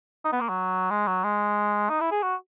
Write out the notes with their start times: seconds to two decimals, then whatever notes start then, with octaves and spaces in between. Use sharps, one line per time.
0.25 D#4
0.32 B3
0.41 A#3
0.49 F#3
0.90 G#3
1.07 F#3
1.24 G#3
1.89 D#4
2.01 E4
2.11 G#4
2.23 F#4